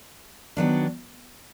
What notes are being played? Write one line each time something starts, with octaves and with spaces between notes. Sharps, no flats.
D#3 F#3 B3 D4